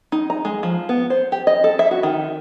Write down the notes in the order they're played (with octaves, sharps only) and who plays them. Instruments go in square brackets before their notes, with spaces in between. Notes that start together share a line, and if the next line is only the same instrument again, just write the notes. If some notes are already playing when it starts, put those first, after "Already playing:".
[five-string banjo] D#4
A#5
G#3
F3
B3
C5
G4
D#5
A4
E5
F#4
D#3